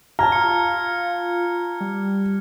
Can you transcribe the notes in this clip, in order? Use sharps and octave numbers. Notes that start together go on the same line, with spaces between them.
G4 A5 A#5 F6 G#6
F4 F6 C#7
G3